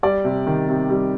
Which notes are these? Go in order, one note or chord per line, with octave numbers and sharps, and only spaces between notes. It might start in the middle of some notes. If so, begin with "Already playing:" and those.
G3 D5
C3
D#3
C3
G3